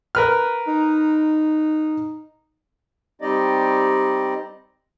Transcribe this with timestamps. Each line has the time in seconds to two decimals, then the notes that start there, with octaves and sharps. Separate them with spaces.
0.15 A#4 B4 F6
0.68 D#4
3.22 G3 C4 D#4 G4 D5 D#5